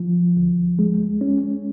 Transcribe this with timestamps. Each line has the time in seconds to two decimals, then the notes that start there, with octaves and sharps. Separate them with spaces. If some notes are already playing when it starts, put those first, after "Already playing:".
Already playing: F3
0.37 D2
0.79 G#3
1.21 C#4